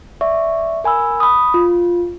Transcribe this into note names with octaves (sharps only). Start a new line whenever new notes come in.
D5 E5 C#6
A#4 G#5 B5 E6
B5 D#6
F4